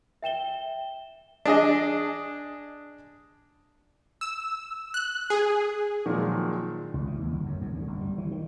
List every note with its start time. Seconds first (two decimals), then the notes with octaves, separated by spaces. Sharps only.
0.22 E5 G5 E7 G7
1.45 D4 G#4 D#5
4.21 E6
4.94 F#6
5.30 G#4
6.06 A#2 D#3 F3 F#3 G#3
6.94 C#2
7.07 E3
7.19 D#2
7.33 G1
7.46 F#2
7.61 F#2
7.74 D2
7.87 G1
8.01 G3
8.18 E3
8.31 D#3